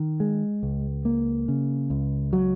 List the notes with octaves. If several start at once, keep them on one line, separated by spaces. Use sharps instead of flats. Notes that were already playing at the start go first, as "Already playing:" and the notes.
Already playing: D#3
G#3
C#2
A#3
C#3
C#2
F#3